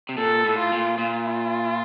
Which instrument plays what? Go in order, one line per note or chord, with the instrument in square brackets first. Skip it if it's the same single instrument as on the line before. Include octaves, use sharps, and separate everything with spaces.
[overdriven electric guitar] C3
[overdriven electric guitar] A#2 [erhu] A4
[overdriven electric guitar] A2
[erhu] F4
[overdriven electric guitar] A#2
[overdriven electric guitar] A#2 [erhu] F4